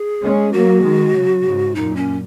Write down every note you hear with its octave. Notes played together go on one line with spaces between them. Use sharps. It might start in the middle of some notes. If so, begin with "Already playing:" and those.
Already playing: G#4
G#3 C#4
F#3 A#3 F#4
D#3 G#3
C#3 F#3
G#2 C#3
F#2 A#2 D#4
C#4